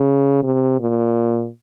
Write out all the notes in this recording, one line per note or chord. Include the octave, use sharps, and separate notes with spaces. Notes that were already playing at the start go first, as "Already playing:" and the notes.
Already playing: C#3
C3
A#2